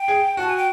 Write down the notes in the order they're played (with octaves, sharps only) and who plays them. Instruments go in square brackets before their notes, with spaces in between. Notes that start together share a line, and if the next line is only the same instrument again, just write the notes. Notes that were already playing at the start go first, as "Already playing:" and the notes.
Already playing: [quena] G5
[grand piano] G#4
[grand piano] F#4 [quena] A5
[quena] G#5
G5